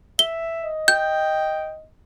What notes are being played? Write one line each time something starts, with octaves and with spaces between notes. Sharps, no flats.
E5 G7
D#5
G5 G6